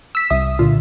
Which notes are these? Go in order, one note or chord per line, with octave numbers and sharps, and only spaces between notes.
E6 B6
C2 E5 D#6
A#2 D3 F4